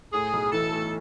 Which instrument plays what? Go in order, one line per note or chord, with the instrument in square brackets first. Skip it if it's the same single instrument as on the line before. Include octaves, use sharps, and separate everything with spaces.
[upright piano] A2 [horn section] G#4
[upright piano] B1
[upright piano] E3 [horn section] A4
[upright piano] A3